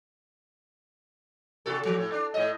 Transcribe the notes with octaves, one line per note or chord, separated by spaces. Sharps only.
C3 F#4 A4
F3
A2
D4
A2 D#5